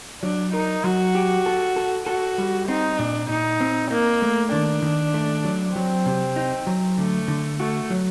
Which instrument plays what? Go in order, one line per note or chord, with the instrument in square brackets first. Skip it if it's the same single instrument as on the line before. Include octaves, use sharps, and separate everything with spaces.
[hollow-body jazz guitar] F#3 [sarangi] D4
[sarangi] D#4 [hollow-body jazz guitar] A#4
[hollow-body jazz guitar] F#3 [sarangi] F#4
[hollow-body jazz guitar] G4
A4
A4
[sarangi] F#4 [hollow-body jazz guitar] A4
[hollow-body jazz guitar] G3
[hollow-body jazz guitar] C4 [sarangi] D#4
[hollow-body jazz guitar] A#2 [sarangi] D4
[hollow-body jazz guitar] A#2 [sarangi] D#4
[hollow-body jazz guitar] C4
[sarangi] A#3 [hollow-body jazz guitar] D#4
[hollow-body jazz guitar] A3
[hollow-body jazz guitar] D#3 [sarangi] D4
[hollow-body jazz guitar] D#3
A3
F#3
[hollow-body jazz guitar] F#3 [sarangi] C4
[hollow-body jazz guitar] C3
D#4
F#3
[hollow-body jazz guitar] D3 [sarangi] A3
[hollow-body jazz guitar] D3
[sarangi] A3 [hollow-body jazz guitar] F#4
[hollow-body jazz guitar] F#3